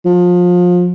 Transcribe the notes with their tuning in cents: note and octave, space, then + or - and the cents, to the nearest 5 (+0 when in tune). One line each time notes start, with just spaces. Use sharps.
F3 +25